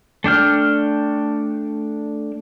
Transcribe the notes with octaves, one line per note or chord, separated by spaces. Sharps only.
A3 D4 G5 F6